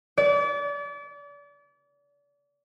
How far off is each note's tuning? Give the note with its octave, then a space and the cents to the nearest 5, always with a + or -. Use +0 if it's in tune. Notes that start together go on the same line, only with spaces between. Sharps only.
D5 -35